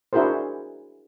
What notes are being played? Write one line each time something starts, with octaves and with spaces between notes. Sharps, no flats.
D4 E4 F#4 G#4 A#4 C5